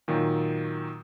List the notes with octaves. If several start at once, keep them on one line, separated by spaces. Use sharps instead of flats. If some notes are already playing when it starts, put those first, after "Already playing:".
A#2 D#3 F#3